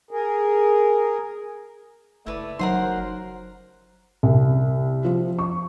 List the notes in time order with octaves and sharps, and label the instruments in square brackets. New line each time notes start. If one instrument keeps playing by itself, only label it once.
[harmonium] G#4 A#4
[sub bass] F#1 [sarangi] A3 [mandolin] E4 B4 D5
[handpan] F#3 D#4 [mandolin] A#4 F#5 C6 [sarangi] C5
[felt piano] C2
F3
C#6